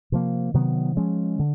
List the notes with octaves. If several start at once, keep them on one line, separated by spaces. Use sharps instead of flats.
C3 F3 A#3
C3 D#3 F#3 B3
F3 G#3 C#4
D3